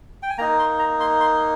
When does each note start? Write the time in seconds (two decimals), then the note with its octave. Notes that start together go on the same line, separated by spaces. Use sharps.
0.23 G5
0.30 G#5
0.38 A#3 A#5
0.41 D#4
0.59 C6
0.79 A#5
1.00 C6
1.21 C6